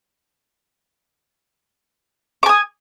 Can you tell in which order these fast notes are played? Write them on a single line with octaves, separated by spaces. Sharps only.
D6 G#5 D#6